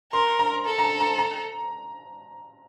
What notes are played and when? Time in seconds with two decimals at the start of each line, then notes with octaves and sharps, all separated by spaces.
0.12 A#4 C6
0.39 A#5
0.66 A4
0.78 A#5
0.84 A5
1.00 A#5
1.18 A#5